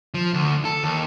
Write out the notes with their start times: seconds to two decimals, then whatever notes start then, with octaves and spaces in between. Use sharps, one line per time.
0.14 F3
0.34 D2
0.65 A4
0.84 D#2